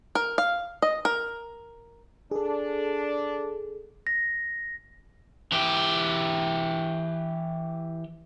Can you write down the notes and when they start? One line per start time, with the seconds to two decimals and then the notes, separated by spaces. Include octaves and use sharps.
0.15 A#4
0.38 F5
0.82 D#5
1.05 A#4
2.31 D4 G#4 A4
4.07 A#6
5.52 E3 G4